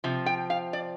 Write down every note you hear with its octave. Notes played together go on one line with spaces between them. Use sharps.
C3 F3
G5
F5
D5